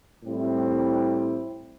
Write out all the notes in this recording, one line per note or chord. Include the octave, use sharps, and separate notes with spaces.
A2 G3 C4 E4